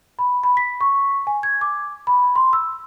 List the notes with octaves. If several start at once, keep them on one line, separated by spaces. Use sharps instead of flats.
B5
B5
B6
C#6
G#5
G#6
D6
B5
C6
E6